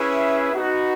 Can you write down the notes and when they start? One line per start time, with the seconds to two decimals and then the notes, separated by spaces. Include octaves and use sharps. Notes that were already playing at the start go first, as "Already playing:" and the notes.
Already playing: C#4 E4 G#4 B4 E5
0.53 B3 D#4 F#4 B4